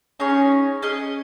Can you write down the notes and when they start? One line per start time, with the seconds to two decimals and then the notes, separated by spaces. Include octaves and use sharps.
0.20 C#4 D#4 G#4 C#5
0.82 C#4 G#4 D#5